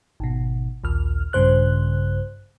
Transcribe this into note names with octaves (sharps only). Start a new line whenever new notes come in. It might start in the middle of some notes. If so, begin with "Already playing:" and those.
G#1 B2
A#1 D#2 F6
A#1 G2 C#3 C5 F#6